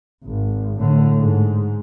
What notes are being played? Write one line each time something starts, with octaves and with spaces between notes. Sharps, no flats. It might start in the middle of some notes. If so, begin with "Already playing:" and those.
G#1
A2 D3
G#2